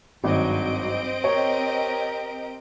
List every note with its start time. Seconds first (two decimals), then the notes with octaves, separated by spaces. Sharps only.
0.24 G#1 G2 F#3 C4 D#5 D7
1.24 G4 A#4 C#5